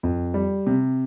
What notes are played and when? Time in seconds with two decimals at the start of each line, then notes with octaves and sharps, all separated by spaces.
0.03 F2
0.34 G3
0.67 C3